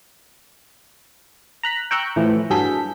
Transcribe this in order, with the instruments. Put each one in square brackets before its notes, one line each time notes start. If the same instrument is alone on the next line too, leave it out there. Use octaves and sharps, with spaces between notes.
[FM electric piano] A#5 F#6 B6
G5 A#5 C#6 E6 F#6 G6
A2 E3 F3
G2 F#3 G#4 A4 G6 B6